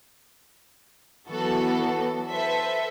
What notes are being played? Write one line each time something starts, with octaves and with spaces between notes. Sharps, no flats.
E3 F#3 B3 F#4 A4
A4 B4 C5 E5